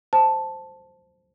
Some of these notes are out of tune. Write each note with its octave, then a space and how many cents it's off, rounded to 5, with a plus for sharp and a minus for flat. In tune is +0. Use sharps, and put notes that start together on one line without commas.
C5 +0 A5 +0